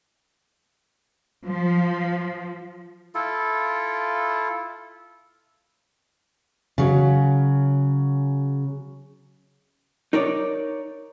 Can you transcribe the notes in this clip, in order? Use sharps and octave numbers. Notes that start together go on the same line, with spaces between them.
F3
E4 F4 A4
C#3 F#3
D#4 A#4 C#5 D5